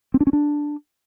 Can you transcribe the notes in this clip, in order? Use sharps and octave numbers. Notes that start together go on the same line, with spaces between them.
C4
D4
C#4
D4